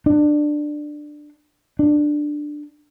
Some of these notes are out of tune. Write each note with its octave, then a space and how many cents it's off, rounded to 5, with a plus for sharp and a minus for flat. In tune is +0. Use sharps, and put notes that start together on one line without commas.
D4 +15
D4 +10